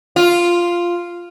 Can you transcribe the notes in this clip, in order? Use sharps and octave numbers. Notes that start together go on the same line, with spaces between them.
F4